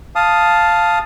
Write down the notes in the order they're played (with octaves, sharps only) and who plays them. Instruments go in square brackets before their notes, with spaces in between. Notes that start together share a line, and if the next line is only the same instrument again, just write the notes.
[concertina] F5 A5 D#6